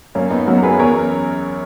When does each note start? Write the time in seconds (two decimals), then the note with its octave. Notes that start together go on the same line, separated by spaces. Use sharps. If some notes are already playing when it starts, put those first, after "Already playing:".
0.15 F#2 A#3 C#4
0.30 B3 D#4
0.47 F#2 F#4 A#4
0.58 A#4
0.63 G#4 B4
0.79 E2 A#4 C#5